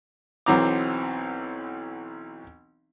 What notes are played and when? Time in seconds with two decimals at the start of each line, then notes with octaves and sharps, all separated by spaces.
0.46 B1 E3 F#3 C4 A#5 D6